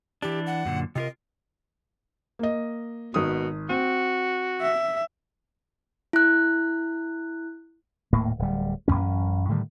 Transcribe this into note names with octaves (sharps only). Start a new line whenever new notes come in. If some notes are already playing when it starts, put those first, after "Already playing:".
E3 D4 G4
F#5
F#2 A#2 D3
C3 F4 A#4 D#5
A#3 D#5
G#1 B2 D#6
C4 F#4
E5
E4 F#6
D#1 A2 A#3
D1 G3
A1 F#2 B2 C#4
A2 D3 D#3 G3